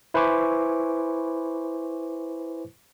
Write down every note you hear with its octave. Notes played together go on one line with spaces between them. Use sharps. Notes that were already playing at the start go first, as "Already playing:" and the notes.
E4 B4 C5 G#5 C#6 D6